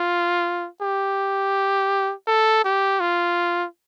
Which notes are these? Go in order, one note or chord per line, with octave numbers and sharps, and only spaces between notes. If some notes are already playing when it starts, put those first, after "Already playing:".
Already playing: F4
G4
A4
G4
F4